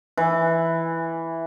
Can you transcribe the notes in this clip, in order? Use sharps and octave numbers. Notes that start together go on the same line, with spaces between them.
E3